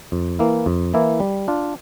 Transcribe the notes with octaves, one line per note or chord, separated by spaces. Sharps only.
F2
E3 A#3 E4
F2
E3 A#3 E4
G3
D4 F4